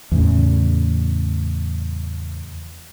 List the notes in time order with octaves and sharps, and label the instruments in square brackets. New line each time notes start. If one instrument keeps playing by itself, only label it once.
[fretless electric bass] E2 A2 C#3